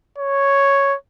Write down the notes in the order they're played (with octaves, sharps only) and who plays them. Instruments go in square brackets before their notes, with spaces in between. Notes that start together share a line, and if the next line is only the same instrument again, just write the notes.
[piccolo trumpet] C#5